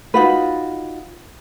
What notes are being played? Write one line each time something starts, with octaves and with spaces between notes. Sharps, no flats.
D#4 F4 F#4 B4